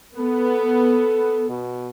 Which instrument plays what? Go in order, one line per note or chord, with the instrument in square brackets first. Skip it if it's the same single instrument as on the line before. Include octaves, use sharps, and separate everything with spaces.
[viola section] B3 [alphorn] A4
[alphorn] B2